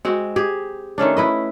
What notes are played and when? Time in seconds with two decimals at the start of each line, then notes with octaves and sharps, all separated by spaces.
0.05 G#3 C4 F#4
0.36 G4 G#4
0.98 D#3 A3 C#4 D4
1.17 E4 B4 D#5